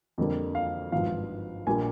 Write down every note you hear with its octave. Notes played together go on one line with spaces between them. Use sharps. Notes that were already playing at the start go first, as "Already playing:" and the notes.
F2 D3 G3 A#3
F5
G#1 G2 F3 F5
A#1 A#2 G3 A#3 G#5